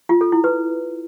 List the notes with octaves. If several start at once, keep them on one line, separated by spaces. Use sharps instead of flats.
F4
A4
E4
B4